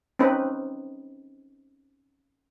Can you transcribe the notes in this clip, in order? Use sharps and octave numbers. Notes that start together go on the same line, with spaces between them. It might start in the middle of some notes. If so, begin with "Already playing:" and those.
C4 C#4 D#4 B4